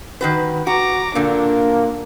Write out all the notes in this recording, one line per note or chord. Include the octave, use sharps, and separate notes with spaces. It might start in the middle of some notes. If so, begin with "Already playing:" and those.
D#3 F#4 B4
F#4 A#5 D6
A#2 D3 A#3 D4